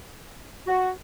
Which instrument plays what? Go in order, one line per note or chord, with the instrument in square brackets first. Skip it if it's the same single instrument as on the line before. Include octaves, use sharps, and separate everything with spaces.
[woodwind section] F#4